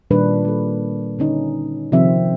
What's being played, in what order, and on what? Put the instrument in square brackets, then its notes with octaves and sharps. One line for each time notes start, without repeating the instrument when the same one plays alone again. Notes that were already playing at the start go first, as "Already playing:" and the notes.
[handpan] A#2 D#3 G3 D4 B4
A#3 A4
D3 C#4 D#4
C3 D#3 F3 C4 E5